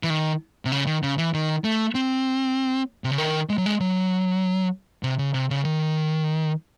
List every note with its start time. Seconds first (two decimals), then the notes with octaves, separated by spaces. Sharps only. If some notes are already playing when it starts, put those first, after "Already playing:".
0.03 E3
0.10 D#3
0.65 C3
0.72 C#3
0.87 D#3
1.03 C#3
1.18 E3
1.34 D#3
1.64 A3
1.95 C4
3.04 C3
3.11 C#3
3.18 D#3
3.49 G#3
3.58 F#3
3.66 G#3
3.80 F#3
5.03 C3
5.19 C#3
5.34 C3
5.50 C#3
5.65 D#3